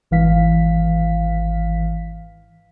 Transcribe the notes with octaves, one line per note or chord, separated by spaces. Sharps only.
G#1 E3 F5 B6